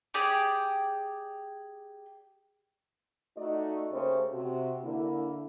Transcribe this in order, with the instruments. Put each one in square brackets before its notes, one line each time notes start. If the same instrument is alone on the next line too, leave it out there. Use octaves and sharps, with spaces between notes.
[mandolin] G4 G#4 D5
[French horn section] A3 D#4 F#4 D5 D#5
C#3 A3 A#3 G4 C5 C#5
C3 F#4
D3 A#3 E4